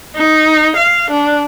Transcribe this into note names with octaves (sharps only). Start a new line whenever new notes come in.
D#4
F5
D4